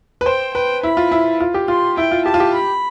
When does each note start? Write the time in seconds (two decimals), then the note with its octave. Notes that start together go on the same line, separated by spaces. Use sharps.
0.21 B4
0.25 C5 G5
0.54 B4 G5
0.83 E4 B5
0.97 F4
1.12 E4
1.40 F4
1.54 G4
1.68 F4 C6
1.97 E4 G5
2.11 F4
2.25 G4 A5
2.34 F4
2.40 G4
2.54 B5